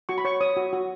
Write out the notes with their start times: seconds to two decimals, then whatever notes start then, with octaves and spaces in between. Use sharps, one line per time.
0.09 F#4 C#6
0.18 B5
0.25 C#5 C#6
0.41 C#5 D#6
0.56 F#4
0.73 F#4